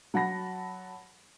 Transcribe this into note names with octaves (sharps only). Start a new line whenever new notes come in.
F#3 F#5 A5 B5 A#6